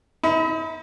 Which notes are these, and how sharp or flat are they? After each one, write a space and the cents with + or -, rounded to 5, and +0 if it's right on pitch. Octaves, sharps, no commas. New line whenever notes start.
D#4 +45 E5 -35 B5 +25